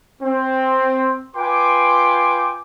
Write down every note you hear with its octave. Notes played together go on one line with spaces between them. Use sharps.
C4
F4 B4 G5 G#5 C6 D6